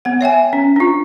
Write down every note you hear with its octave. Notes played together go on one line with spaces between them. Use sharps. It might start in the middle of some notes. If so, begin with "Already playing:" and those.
B3 F#5
C#5 E5 G5 G#5
C#4
D4 F4